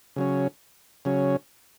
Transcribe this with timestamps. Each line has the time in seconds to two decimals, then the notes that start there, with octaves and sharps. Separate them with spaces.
0.16 C#3 F#3 C#4
1.05 C#3 F#3 C#4